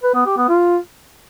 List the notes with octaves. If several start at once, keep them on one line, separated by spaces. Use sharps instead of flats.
B4
B3
G4
B3
F4